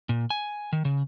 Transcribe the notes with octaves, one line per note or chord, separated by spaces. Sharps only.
A#2
G#5
D#3
C#3